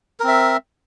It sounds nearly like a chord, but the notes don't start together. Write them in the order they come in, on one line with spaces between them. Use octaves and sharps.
A#4 C4 E5